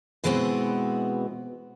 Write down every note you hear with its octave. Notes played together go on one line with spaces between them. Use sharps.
B2 E3 G#3 B3 C4 F#4